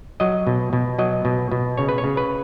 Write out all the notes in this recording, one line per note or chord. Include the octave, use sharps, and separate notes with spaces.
F#3 D#5
B2
B2
F#3 D#5
B2
B2
C#3 C#5
B4
C#5
C#3
B4